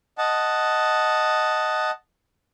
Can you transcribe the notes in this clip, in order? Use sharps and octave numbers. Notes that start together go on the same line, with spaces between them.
D#5 F#5 A5